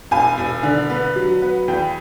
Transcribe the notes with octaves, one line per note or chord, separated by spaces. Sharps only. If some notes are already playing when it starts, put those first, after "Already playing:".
E1 G#5
E1
D3
B3
F#3
B3
E2 G5